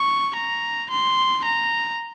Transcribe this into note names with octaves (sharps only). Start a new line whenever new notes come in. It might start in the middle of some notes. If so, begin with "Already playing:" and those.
Already playing: C#6
A#5
C6
A#5